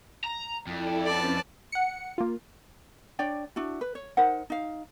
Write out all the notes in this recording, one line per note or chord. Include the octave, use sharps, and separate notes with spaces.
A#5
F2 E4 A4 D5
C4 C#4 B4 D5 A5
F#5 C#7
A#3 F4
D4 C#5 D5 G5
D4 E4 F#4
B4
C#5
D#4 A#4 C5 F#5
D#4 F5